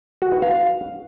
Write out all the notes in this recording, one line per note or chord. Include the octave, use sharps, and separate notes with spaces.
F#4
B4
F5